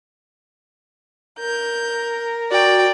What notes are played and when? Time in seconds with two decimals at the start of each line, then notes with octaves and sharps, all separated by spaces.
1.39 A#4 G6
2.51 F#4 D5 G5